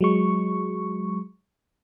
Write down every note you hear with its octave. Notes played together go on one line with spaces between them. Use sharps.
F#3 G#3 C#6